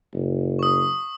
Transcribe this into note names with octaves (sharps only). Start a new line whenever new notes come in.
F#1
C#6 D#6